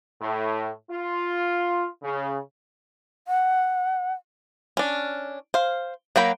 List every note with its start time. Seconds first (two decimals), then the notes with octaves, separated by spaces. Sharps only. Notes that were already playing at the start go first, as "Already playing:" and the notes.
0.22 A2
0.90 F4
2.03 C#3
3.28 F#5
4.77 C#4 D4
5.54 C5 F5
6.16 F#3 A#3 G5 B5